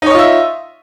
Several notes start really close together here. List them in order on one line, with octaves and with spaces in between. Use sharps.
D#4 C#5 D#5 F4 E5